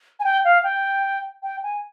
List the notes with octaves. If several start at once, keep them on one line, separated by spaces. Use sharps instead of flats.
G#5
G5
F5
G5
G5
G#5